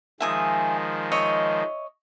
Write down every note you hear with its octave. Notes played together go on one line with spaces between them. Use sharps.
D#3 F3 G#3 E5 G#5 D#6
C#5 D#5 E5